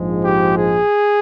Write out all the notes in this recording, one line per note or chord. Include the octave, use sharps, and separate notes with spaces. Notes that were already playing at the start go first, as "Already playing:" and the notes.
Already playing: A#1 G#2 F3 G#3
G4
G#4